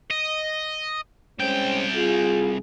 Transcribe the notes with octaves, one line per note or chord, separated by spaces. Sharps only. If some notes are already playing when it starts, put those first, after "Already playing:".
D#5
C2 G#3 C#4 C5 G5
F4 G#4